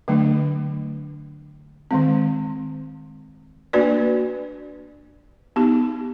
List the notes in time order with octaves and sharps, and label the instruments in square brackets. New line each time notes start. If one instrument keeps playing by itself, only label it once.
[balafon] D3 F#3 A3 D4
D#3 G#3 C4
A#3 D4 F#4 B4 D5
B3 D#4 G4